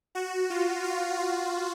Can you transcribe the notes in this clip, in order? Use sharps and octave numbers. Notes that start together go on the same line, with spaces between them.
F#4
F4
F4
F#4